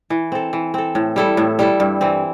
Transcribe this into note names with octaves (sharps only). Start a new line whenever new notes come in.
E3
C4 A4
E3
C4 A4
A2
G3 E4 A4
A2
G3 E4 A4
G2
E3 C4